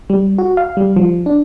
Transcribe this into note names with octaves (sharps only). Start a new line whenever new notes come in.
G3
F#4
F5
G3
F3
D4